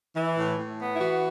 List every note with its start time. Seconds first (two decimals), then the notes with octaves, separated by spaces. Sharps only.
0.16 E3
0.38 A2
0.58 A2
0.80 B3
0.95 E4
1.01 E3 F#4